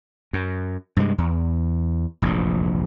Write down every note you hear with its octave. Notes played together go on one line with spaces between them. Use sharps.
F#2
G2 C3 G3 G#3
E2
F1 A#1 E2 G#2